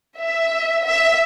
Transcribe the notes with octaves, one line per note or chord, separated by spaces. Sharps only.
E5
E5